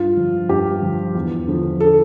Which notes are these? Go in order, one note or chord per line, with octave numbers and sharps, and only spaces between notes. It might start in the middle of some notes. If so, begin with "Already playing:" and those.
Already playing: G2 F4
F3
G2 G4
F3
E2
D3 F3
A4